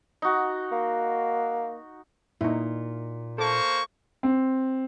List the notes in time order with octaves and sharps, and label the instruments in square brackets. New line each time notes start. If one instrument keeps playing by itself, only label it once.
[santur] D#4 F#4
[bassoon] A#3
[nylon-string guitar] A#2 [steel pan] D#4 E4
[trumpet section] A#3 C5 C#6 [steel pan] A4
[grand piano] C4